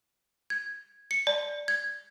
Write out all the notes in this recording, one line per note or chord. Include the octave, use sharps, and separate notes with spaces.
G#6
C#7
D5
G#6